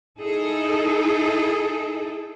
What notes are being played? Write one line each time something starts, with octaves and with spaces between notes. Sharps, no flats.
D#4 E4 G#4 A4